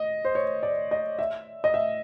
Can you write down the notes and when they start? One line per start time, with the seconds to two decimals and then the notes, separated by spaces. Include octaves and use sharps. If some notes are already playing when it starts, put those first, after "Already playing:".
Already playing: D#5
0.25 C5
0.35 C#5
0.63 D5
0.91 D#5
1.19 E5
1.64 D#5
1.74 E5